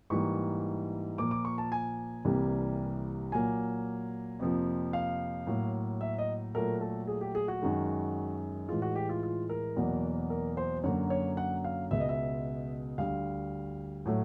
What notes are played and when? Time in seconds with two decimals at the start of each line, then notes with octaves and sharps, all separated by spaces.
0.10 G#2 E3 G3 A#3 C#6
1.18 A#2 F3 A#3 D6
1.31 D6
1.45 C#6
1.58 A5
1.72 G#5
2.25 C2 C3 E3 G3 A#3
3.32 A#2 F#3 A#3 G#5
4.39 F2 C3 F3 A#3
4.93 F5
5.47 A2 F#3 A#3
6.01 E5
6.18 D#5
6.55 A#2 F#3 A3 A#4
6.81 A4
7.07 G#4
7.21 G4
7.35 G#4
7.48 F#4
7.62 F#2 D#3 G#3
8.69 A2 E3 G#3 F4
8.82 F#4
8.95 G4
9.09 F4
9.23 F4
9.49 A#4
9.76 E2 B2 F#3 A#3
10.30 A#4
10.57 C5
10.84 F#2 D3 F#3 A#3 C#5
11.10 C#5
11.37 F#5
11.64 F5
11.91 C#2 B2 G#3 E5
12.00 D#5
12.09 E5
12.98 D2 D3 G3 F5
14.06 A2 F#3 A3